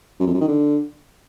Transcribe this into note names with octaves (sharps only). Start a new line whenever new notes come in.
F#2
F2
F#2
D#3
D3